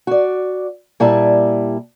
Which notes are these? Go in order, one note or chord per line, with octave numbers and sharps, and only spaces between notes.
F#4 D5
A#2 G3 E4 A5